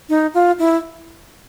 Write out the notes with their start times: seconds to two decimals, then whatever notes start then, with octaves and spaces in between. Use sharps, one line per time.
0.09 D#4
0.34 F4
0.59 E4